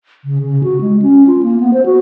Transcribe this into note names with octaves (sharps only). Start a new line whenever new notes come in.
C#3
C#3
F#4
G#3
C#4
F4
A#3
B3
C5
F#4